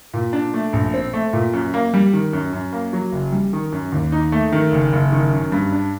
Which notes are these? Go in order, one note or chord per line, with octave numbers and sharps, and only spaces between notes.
A#2
D4
A3
A#1
C4
A3
A#2
F#2
A#3
G3
D#3
F#2
F#2
A#3
F#3
F#1
G3
D#3
F#2
D#2
D#4
A3
D#3
F#1
F#1
D#3
F#2
G2
D4